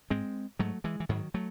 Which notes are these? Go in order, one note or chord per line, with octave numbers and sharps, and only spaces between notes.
G#2 G#3 C4
G#2 F#3 A3
E3 G#3
E3
G#2 D#3 F#3
F#3 A3